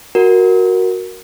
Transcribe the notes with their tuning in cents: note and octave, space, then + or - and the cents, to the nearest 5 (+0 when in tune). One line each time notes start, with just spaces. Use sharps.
F#4 +0 A#4 +0